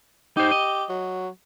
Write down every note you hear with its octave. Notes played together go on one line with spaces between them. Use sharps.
D#4 G4 C5
D#5
F#3